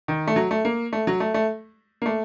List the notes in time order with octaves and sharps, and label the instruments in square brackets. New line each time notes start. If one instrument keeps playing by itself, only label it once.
[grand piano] D#3
A3
F#3
A3
A#3
A3
F#3
A3
A3
A#3
A3